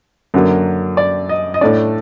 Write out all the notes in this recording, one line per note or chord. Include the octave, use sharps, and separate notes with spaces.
F#2 D3 F#3 A#3
D5
D#5
D#5
A2 A3 D4 D5